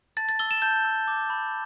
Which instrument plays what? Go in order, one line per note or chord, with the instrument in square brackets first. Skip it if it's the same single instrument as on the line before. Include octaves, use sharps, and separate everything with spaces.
[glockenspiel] A5 A6
A6
E6 G7
E7
A5 G6
E6
D6
B5